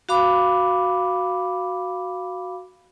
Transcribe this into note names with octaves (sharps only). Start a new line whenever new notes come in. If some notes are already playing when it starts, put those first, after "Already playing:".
F#4 F5 B5 D6